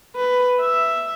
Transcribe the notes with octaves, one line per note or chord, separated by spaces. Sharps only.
B4
E5